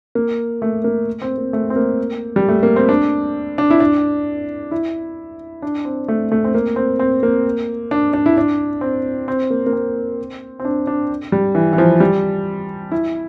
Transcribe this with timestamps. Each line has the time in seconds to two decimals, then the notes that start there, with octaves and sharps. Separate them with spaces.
0.15 A#3
0.62 A3
0.84 A#3
1.22 C4
1.38 A#3
1.53 A3
1.70 C4
1.76 A#3
2.36 G3
2.49 A3
2.63 A#3
2.76 C4
2.89 D4
3.58 D4
3.70 E4
3.80 D4
4.71 E4
5.62 D4
5.85 C4
6.08 A3
6.32 A3
6.44 C4
6.55 A#3
6.76 C4
6.99 C4
7.23 A#3
7.91 D4
8.13 D4
8.26 E4
8.38 D4
8.81 C4
9.28 C4
9.50 A#3
9.66 A#3
9.73 C4
10.60 C4
10.65 D4
10.87 D4
11.32 G3
11.55 E3
11.73 E3
11.78 F3
12.00 G3
12.92 E4